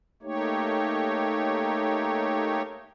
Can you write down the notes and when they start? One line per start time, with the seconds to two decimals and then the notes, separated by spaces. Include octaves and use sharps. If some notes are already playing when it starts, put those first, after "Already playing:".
0.22 A3 A#3 D#4 G4 C#5